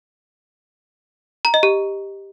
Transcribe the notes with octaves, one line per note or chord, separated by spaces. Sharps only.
A#5
D#5
G4